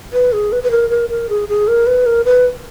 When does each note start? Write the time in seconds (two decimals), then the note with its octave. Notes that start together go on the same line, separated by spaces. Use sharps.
0.13 B4
0.33 G#4
0.52 B4
0.63 B4
0.71 A#4
0.90 A#4
1.10 A#4
1.29 G#4
1.49 G#4
1.68 A#4
1.87 B4
2.06 A#4
2.25 B4